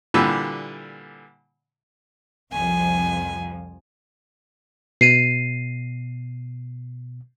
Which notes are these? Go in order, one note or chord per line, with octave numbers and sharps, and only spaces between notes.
A#2 D3 E3 G3 G4 E6
C2 F2 F3 G#5
B2 C7 D#7